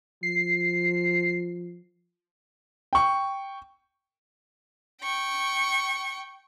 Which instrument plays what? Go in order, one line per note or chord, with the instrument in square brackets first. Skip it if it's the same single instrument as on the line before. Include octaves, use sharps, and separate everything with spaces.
[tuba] F3 [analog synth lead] C7
[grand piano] G5 C#6
[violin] G5 C#6